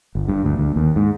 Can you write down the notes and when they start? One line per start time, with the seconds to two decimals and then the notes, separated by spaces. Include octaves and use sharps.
0.15 G1
0.28 G2
0.45 D2
0.58 D2
0.76 D#2
0.96 G#2